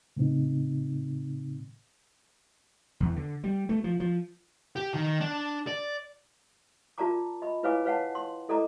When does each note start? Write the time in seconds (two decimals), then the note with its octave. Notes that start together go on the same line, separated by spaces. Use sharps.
0.17 A2 C#3 C4 D#4
3.00 E2
3.16 D3
3.44 G3
3.69 A3
3.84 F3
4.00 F3
4.76 G4
4.94 D#3
5.20 D4
5.67 D5
6.98 F4 A#4 D5 A5 A#5 D6
7.42 D#5 B5
7.63 E4 B4 C#5 F5 G#5 D6
7.85 B4 C#5 F5 F#5 A5
8.15 C6
8.49 E4 A4 D5 D#5 A#5 D6